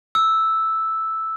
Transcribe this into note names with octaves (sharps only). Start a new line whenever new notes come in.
E6